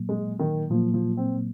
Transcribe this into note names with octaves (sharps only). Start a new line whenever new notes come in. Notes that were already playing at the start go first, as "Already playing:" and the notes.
Already playing: A#2 F#3 A#3
G#3
D#3
A#2 F3 F#3 A#3
F3
C4